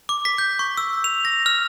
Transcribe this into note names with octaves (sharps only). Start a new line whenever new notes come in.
D6
B6
G6
C#6
E6
F7
A#6
F6